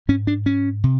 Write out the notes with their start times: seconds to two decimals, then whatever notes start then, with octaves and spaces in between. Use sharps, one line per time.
0.08 G#2 C#4
0.27 D4
0.46 C#4
0.84 C3